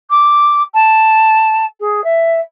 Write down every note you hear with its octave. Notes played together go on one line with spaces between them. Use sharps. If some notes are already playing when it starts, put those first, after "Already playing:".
D6
A5
G#4
E5